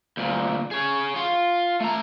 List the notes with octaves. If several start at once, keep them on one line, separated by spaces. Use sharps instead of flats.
D2 A#2
G#4 C#5
F4
A3 A#5